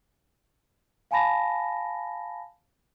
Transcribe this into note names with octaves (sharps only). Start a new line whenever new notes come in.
F5 G#5 A5 B5 A#6